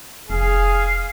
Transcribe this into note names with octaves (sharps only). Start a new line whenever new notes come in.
F1 G#4 F5